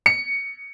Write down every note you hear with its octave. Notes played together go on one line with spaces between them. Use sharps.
C#7